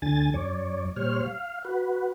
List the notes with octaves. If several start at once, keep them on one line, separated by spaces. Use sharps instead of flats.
D2 D3 G#5 A6
F#2 C#5 D5
A#2 G3 C5 C#5 F6
F5
F#4 B4